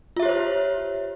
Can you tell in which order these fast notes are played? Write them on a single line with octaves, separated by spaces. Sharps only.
F4 E5 G4 C#5 C5